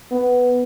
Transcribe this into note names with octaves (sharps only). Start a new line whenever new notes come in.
B3